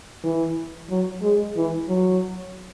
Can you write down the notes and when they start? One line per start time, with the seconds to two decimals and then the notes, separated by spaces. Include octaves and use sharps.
0.24 E3
0.90 F#3
1.22 G#3
1.56 E3
1.88 F#3